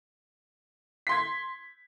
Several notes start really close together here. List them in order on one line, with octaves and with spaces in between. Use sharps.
B6 C6 G#6